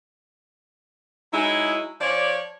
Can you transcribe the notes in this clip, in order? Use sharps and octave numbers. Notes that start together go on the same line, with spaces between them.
F#3 G#3 D#4 E4
F3 C#5 D5